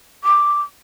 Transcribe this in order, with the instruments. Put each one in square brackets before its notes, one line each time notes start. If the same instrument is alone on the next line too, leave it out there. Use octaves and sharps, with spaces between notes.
[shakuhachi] D6